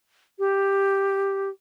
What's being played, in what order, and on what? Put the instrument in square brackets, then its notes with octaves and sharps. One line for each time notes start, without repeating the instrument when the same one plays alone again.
[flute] G4